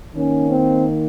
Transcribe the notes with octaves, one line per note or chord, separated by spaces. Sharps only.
D#3 A#3 C#4
C4